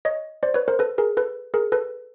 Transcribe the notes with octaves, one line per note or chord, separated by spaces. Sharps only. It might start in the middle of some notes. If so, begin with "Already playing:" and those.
C#5 D#5
C5 D5
B4 C#5
A#4 C5
A4 B4
G#4 A#4
A4 B4
G#4 A#4
A4 B4